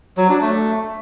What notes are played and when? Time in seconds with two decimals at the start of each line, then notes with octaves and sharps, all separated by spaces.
0.17 F#3
0.29 D4
0.41 A3